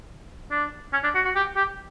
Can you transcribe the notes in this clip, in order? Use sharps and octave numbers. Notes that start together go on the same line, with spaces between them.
D4
C#4
D4
F#4
F#4
G4
G4